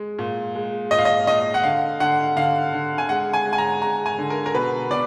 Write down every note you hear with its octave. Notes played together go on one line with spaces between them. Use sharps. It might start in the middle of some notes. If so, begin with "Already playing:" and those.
Already playing: G#3
A#2
G#3
A#2 D#5
F5
D#5
A#2 D#5
F#5
D3 F5
D3 F#5
D3 F5
D3
G#5
G#3 F#5
G#5
G#3
G#5
A#5
G#3 A#5
G#5
D3
A#4
A#4
B2 B4
B2 D5